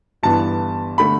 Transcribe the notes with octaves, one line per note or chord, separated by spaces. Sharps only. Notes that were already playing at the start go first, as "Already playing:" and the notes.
G1 G2 E3 B3 A5
D3 A3 B5